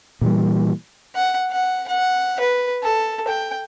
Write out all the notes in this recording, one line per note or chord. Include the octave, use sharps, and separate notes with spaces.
A#2 E3 G3
F#5
F#5
F#5
B4
A4
G5